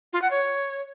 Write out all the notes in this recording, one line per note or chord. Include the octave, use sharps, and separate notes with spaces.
F4
F#5
C#5